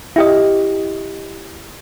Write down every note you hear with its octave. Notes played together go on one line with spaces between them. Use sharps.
E4 G4 D#5